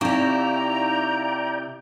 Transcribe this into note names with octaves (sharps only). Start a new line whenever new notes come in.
C3 D#4 E4 D5 F5 G5 A#5 C#6